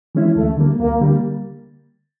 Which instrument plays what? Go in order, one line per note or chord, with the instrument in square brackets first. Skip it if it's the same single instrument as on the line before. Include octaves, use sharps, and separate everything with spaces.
[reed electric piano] E3 G#3 C#4 E4
[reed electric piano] D2 [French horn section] A3
[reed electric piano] D3 G3 A#3
[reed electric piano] D2 [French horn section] A#3
[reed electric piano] D3 G3 A#3